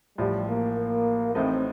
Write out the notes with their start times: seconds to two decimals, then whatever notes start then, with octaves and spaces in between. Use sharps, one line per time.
0.18 A1 A2 F3 G3
0.48 A#3
1.35 A1 A2 A3 C4 D#4